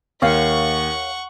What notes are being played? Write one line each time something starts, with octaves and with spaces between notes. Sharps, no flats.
D#2 C#5 F5 F#5 C#6